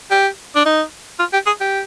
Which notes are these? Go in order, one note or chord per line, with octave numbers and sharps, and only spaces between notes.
G4
D4
D#4
F4
G4
G#4
G4